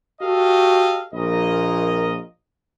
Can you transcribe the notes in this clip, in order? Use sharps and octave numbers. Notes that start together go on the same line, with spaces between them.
F#4 G4 A4 D#5 F5
A#1 A#2 A#4 D#5